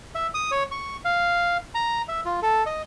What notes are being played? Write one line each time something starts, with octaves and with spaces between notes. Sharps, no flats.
E5
D#6
C#5
C#6
F5
A#5
E5
F4
A4
D#5